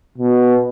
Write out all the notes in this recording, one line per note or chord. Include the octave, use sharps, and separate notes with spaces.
B2